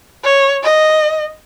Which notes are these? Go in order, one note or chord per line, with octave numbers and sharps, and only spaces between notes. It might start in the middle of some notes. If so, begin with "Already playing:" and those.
C#5
D#5